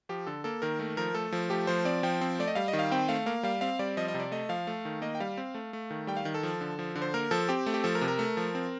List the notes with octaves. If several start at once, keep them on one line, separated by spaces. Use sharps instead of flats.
F3 G4
D3 A4
A#3 A4
D#3 A#4
A3 A#4
F3 A#4
A3 A4
F3
A3 G4
F3 C5
C4 D5
F3 G5
C4
A3 D5
D#5
G3 F5
D#5
D#3
F5
C4 G5
A3 F5
A#3 F5
G3 F5
C4 F5
G3 D5
F3 D#5
D#5
C3
D5
A3 D#5
F3 F5
A3
D#3
A#3 D#5
G5
G3 F5
C4
A3
A3
D#3
G3 G5
F5
D#3
A4
F3
D3
F3
D3
C5
A#3 A#4
F3 A4
C4 G4
A3
G4
F3 A4
A#4
C3
A#4
A3
F3
C4